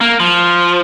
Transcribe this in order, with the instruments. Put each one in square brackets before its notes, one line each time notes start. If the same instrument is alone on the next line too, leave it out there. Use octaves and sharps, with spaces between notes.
[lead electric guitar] A#3
F3